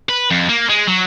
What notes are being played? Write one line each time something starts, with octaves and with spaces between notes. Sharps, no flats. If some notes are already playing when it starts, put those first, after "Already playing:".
B4
F2
A#3
G#3
F#3